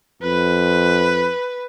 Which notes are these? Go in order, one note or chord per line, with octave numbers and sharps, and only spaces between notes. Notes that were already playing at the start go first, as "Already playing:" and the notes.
F2 B4